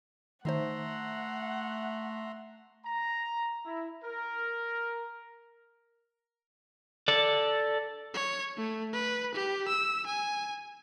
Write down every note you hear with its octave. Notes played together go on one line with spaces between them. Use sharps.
D#3 A3 D#4 C5 E5 F#5 A#5 C6
A#5
E4
A#4
A4 D5
C#5
A3
B4
G4
E6
G#5